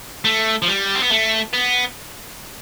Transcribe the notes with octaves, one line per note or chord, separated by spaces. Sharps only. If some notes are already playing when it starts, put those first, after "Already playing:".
A3
F3
G3
C4
B3
A3
B3